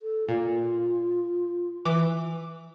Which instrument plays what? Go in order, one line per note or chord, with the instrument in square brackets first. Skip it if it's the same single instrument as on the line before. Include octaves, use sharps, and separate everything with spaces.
[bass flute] A4
[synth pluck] A#2 [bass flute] F4
[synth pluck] E3 D6